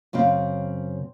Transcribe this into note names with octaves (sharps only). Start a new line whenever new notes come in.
F#2 C#3 C4 F5